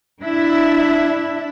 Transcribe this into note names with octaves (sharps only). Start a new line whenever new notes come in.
D4 E4 E5